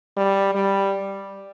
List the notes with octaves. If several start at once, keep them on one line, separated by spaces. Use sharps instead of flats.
G3
G3